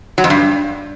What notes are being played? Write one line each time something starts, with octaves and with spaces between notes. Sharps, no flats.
F#3
F2
G2